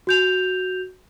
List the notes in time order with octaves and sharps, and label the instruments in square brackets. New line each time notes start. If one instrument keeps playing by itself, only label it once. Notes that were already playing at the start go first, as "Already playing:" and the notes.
[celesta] F#4 G6 F7